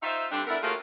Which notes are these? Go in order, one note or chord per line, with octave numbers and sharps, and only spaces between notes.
D#4 F4 C5 E5
G2 D3 G3 C4 D4
B3 D4 E4 A4 A#4
A3 A#3 C#4 F4 F#4 G#4